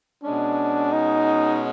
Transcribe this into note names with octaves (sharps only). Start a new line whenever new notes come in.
B2 G#3 C#4 D4
D#4